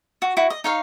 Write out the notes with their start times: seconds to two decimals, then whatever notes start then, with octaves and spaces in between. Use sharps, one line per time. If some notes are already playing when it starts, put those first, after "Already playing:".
0.22 F#4
0.37 E4 F#4
0.50 D#5
0.64 D#4 C#5 F5